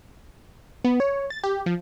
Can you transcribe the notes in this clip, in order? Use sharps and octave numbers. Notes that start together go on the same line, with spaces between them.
B3
C#5
A6
G4
F3